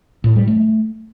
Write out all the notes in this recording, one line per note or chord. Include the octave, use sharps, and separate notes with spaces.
A2
G3
A3